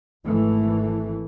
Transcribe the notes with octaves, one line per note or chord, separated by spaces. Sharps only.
G#1 E3 A3